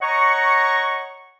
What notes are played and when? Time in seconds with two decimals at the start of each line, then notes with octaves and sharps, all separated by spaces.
0.01 C#5 D#5 F#5 A#5 C#6